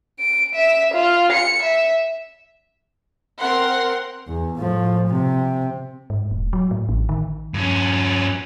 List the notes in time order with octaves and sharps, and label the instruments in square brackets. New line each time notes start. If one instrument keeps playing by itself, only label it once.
[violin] D7
E5
F4
C#7
E5
[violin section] C4 A#4 F#5 C6
[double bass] E2
A2 F3
C3
[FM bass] G#2
E1
F#3
A2
A1
D#3
[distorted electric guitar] G2 C#4